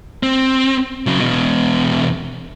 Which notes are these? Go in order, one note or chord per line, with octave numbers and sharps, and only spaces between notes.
C4
C#3 F#3
E2 B2